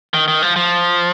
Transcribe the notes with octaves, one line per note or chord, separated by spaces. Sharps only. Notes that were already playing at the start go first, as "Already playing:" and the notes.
D#3
D#3
F3
F3